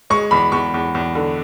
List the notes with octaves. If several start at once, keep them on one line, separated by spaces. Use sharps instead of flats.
G#3 C#6
E2 B5
E2 C#6
E2
E2
D3